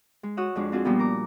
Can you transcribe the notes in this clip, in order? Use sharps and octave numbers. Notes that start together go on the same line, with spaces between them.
G#3
F#4 C#5 F#5 D#6 E6
F2 G#3 D4
C4 F4 F#4 G#4
A#2 F3 G3 B3
A#4 A#5 D6